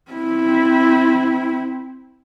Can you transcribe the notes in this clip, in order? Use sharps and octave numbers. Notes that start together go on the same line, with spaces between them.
C4 E4